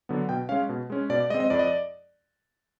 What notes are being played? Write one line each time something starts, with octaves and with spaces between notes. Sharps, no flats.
D3 F#3 B3
B2 G5
G#3 C#4 F5
B2
G#3 C#4
B2 D5
D5
G#3 C4 D#5
D#5
F2 D5
D#5
D5